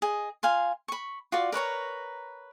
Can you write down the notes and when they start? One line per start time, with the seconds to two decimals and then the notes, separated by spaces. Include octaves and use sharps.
0.02 G#4 D#5
0.43 F4 F5 G#5 C6
0.88 B5 C#6
1.32 F4 F#4 D5
1.52 A#4 B4 C#5 A#5